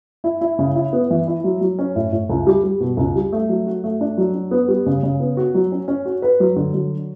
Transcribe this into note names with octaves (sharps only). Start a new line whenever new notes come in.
E4
E4
C#3
E4
B3
E3
E4
F#3
F#3
C#4
A2
A2
C#2
G3
G3
B2
C#2
G3
A3
F#3
F#4
A3
D4
F#3
D4
B3
G3
C#3
C#3
B3
F#4
F#3
C#4
C#4
F#4
B4
F#3
D3
F#3